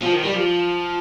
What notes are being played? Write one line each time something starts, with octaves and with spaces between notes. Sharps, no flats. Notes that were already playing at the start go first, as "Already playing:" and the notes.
F3
D#3
G3
F3